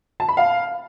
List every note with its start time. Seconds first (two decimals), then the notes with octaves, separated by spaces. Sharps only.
0.20 A5
0.28 B5
0.37 F5